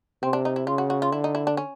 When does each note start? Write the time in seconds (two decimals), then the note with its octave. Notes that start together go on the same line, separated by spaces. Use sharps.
0.23 C3 C4
0.33 D4
0.45 D#4
0.56 E4
0.67 C#3 F4
0.78 F#4
0.90 F#4
1.02 F4
1.12 D3 E4
1.24 D#4
1.35 E4
1.47 D4
1.57 C#4